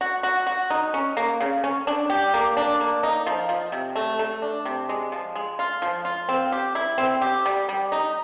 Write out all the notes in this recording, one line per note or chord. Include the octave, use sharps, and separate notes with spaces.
F#4
F#4
F#4
D#4
C#4
A#3
C#3
C#4
D4
G4
A#3
D4
A#3
D#4
F3
F3
C3
A3
A3
D4
C3
G#3
F3
G#3
F4
F3
F4
C4
G4
E4
C4
G4
G3
G3
D#4